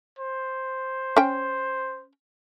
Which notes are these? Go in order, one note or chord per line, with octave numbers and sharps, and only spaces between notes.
C5
C#4 G5